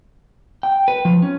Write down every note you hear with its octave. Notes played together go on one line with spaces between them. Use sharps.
G5
B4
F3
C#4